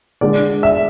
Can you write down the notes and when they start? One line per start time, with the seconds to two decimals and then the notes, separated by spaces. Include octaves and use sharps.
0.21 D3 G#3 D4 D5
0.63 E5